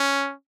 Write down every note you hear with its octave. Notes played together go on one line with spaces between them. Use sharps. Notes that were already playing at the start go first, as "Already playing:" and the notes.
Already playing: C#4